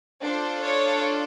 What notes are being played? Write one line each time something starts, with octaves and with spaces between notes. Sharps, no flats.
D4 F4 A4 C5
C#5